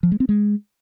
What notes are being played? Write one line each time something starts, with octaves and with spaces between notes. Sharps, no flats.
F3
G#3
C4
G#3